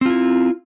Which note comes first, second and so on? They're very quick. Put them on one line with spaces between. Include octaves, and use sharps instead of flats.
C4 F4 E4